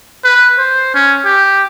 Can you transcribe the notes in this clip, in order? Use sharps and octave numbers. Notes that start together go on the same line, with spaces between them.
B4
C5
C#4
G4